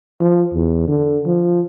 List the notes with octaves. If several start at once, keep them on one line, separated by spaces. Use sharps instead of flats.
F3
E2
D3
F3